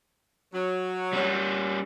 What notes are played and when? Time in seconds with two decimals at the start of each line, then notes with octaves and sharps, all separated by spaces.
0.52 F#3
1.13 G3 C#4